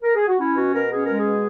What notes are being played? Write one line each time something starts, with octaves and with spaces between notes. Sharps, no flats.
A#4
G#4
F#4
C#4 E4
B2 F#4
B2 A#4
C#4 G#4
G#3 A#4
G#4
B2